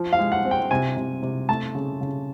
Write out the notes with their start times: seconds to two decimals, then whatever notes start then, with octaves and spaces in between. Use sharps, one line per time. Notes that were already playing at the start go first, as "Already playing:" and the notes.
Already playing: F3
0.13 F5
0.19 G#3
0.32 F#5
0.45 C4
0.51 G5
0.71 C3 G#5
0.97 C3
1.23 C3
1.49 A3 A5
1.75 C#3
2.01 C#3